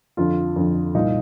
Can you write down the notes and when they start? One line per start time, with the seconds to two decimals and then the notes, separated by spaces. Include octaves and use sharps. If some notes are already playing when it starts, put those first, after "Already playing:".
0.17 F2 D3 F4
0.56 F2 D3
0.94 C2 A#2 D#4